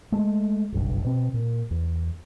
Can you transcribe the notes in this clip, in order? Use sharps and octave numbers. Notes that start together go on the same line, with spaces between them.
G#3 A3
F#1 B1 G2
B2 C4
A#2
E2